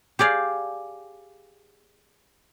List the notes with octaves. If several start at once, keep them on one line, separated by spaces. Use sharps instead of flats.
G4 G#4 D5 F5